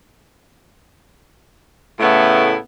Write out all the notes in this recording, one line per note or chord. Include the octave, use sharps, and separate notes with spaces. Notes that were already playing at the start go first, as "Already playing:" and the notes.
A2 C#3 A3 B3 E4